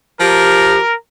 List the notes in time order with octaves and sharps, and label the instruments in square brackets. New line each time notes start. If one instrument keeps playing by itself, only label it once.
[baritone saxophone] F3 [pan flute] G4 [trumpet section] A#4